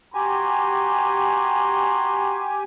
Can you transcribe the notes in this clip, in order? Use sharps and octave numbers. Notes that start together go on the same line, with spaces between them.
F#4 G4 G#5 A#5 C6